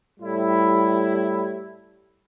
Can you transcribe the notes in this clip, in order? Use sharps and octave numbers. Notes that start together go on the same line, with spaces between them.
A2 G3 E4 G4